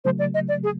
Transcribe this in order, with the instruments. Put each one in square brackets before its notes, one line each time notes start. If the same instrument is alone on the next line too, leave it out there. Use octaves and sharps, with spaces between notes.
[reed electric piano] C#3 F#3 A3 [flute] C5
[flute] D5
D#5
D5
G#4